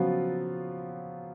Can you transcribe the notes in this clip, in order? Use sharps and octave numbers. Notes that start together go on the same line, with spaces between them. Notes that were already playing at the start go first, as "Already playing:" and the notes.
Already playing: C#3 F3 F#3 B3 F4